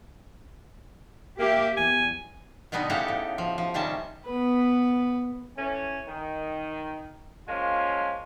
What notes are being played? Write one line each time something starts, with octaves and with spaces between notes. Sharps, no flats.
A#3 G4 E5
E2 G#5
B2 D3 G3 B3 D#4
A2 C#3 G4 A4 F5 F#5
A2
F3
F3
C3 D#3 G3 C#4 A5
B3 B4
E3 A3 C#4
D#3
F3 G#3 A#3 C#4 F4